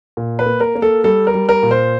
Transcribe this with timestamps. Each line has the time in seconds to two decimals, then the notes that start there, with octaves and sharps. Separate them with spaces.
0.17 A#2
0.39 B4
0.46 A#3
0.60 A#4
0.75 A#3
0.82 A4
1.04 G3 A4
1.27 A#4
1.34 G3
1.49 A#4
1.63 A#2
1.71 C5